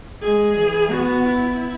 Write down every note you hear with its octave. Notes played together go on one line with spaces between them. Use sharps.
G#3 G#4
E3
B3 F#4
E4